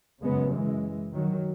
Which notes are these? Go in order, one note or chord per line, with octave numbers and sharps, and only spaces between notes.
F#2 C#3 G#3 B3
E3 G#3
D#3 F#3